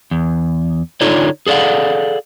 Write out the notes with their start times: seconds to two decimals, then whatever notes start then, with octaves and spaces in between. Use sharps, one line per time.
0.11 E2
1.01 D3 D#4 F4 A4 C#5 D5
1.47 G#4 A4 D5 F5 F#5